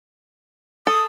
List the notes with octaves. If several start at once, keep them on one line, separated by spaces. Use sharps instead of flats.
A4 D#6